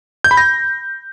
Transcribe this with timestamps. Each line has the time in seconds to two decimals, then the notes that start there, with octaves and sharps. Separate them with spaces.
0.24 G6
0.31 B5
0.37 A#6